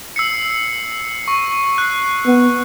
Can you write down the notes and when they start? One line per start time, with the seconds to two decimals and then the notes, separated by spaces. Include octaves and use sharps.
0.16 E6 C7 C#7
1.28 C#6
1.78 F#6 C7
2.27 B3